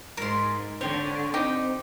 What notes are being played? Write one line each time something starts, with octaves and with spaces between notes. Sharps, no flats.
G#2 A#4 C6
D3 C4 C5 C#5
B2 C4 D#4 G4